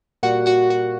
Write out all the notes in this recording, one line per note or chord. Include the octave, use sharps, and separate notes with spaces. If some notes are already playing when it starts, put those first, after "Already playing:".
A#2 G3 A#3 F#4 F#5
F#4 F#5
F#4 F#5